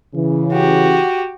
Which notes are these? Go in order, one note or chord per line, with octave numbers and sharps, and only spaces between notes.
C#3 E3
F#4 G4